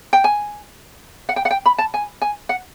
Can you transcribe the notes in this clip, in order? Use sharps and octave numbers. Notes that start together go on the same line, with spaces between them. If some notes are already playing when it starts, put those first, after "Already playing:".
G5
G#5
F#5
G5
F#5
G5
B5
A5
G#5
G#5
F#5